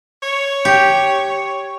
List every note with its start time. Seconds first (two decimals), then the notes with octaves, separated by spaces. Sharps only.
0.22 C#5
0.65 G4